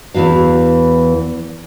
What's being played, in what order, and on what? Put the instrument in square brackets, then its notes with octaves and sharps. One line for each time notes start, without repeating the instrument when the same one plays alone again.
[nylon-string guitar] E2 C3 E3 F#4 F5